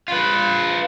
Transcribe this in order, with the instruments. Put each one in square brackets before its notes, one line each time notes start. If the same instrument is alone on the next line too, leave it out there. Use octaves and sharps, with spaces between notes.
[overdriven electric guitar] F4 B4